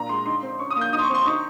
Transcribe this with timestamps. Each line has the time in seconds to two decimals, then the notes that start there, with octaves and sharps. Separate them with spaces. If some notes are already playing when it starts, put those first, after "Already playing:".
Already playing: A#2 A#5
0.09 G#3 C6
0.26 D#4 C6
0.43 C4
0.59 C#4 C#6
0.71 D#6
0.76 A#3
0.81 G6
0.93 D#4 D#6
0.99 C6
1.03 C#6
1.10 C4 C6
1.26 D#4 C#6